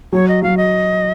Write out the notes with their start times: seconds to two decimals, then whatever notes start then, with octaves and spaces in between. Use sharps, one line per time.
0.13 F#3 C#5
0.28 D#5
0.42 F#3 F5
0.57 D#5